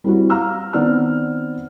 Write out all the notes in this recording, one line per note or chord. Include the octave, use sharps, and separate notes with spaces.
G3 C4 E4 F#4
F5 A#5 E6 F6
D#3 B3 C4 D5 E6 F6